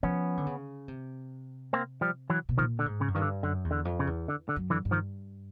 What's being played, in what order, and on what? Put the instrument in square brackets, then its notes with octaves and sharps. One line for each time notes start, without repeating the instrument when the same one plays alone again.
[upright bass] F3 [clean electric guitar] B3 C#4
[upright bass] D3
C#3
C3
[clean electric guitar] A#3 C4
F3 G3
E3 F#3
[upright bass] B2
[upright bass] A#2 [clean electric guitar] D#3 F3
[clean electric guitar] D3
[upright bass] G#2
[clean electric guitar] C#3
[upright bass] F#2
[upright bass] G2 [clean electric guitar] D#3
[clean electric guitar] D3
[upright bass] F#2 [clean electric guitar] D3
[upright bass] E2
[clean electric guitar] D3
[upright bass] F2
[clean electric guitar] C#3
[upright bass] E2
[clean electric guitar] D3
D3
[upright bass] F#2
[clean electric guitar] D3 E3
[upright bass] G2
[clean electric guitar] D#3 F3